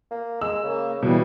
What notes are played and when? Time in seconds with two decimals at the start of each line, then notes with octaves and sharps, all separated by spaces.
0.11 A#3
0.41 G#3 E6
0.64 C#3 A#3
1.03 B2 E3 G3